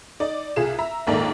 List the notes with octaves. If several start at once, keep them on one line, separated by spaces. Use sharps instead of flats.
D#4 D5
C2 F4 G#4 E7
E5 A#5
A#1 D#2 G#2 A#3 A4 D5